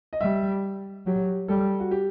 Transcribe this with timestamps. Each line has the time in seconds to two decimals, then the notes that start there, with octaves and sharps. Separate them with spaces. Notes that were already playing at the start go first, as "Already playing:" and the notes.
0.13 D#5
0.21 G3 E5
1.06 F#3 G4
1.48 G3 A4
1.80 F#4
1.91 G4